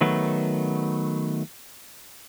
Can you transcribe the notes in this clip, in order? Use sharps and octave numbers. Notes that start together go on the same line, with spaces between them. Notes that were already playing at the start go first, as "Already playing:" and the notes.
D#3 F#3 A3 B3